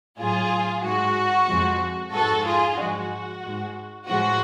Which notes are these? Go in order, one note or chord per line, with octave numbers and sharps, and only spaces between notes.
A2 F#3 F4 G#4
G#2 G#3 F#4
F2 F3 G#3
G#2 G#3 F#4 A4
F4 G#4
G#2 F3 G#3 F#4
G#2 G#3
A2 F3 G#3 F#4